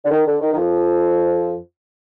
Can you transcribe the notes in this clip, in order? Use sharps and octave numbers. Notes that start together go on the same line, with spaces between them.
D3
D#3
D3
D#3
D#3
F2 F3